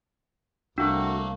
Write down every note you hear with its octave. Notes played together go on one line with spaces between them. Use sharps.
C2 A3 A#3 D4 F#4